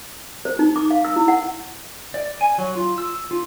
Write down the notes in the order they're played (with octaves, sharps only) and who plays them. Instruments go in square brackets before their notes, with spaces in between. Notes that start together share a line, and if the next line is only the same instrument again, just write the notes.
[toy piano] C5
D#4
D6
F5
E6
E4
F#5
[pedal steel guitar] D5
G#5
F#3
F4
E6
F4